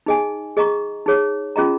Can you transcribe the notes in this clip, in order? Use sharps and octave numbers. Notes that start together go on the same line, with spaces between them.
D#4 G#4 D#5 G#5
G#4 D#5 A#5 C#6
D#4 G#4 C#5
C#4 F4 G#4 D#5 A#5